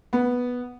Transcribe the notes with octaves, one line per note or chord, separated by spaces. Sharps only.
B3